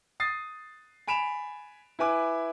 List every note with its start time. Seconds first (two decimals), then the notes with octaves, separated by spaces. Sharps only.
0.20 D#6 A6 C7
1.07 G#5 B5 D7 E7 F7
1.99 E4 B4 G#5 D6